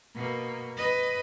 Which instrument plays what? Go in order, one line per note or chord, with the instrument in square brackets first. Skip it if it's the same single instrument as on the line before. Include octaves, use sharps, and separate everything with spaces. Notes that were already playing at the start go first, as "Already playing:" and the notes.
[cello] B2 A#3
B4 D#5